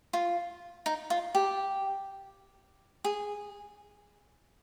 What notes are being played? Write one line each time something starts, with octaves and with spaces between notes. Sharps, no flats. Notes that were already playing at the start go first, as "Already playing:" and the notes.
F4
D#4
F4
G4
G#4